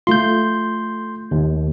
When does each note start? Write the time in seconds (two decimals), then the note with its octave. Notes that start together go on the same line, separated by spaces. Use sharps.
0.07 A3 F4 C6 G6
1.31 D#2